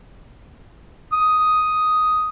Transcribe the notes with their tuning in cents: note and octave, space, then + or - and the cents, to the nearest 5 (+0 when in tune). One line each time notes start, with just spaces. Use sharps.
D#6 +5